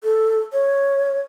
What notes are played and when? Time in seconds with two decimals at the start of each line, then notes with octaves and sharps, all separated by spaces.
0.03 A4
0.52 C#5